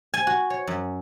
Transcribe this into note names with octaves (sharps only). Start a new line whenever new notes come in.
G#5
F#4
C#5
F#2